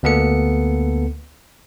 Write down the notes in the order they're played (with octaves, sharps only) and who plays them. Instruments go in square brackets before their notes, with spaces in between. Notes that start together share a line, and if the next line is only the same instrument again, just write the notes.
[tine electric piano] D2 A#3 B3 A4 C#7